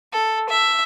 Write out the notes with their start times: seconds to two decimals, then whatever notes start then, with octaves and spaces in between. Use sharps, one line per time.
0.13 A4
0.49 E5